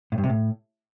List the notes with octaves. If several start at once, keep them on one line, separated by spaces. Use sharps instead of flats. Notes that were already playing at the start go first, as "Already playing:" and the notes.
A2
G2
C3
A2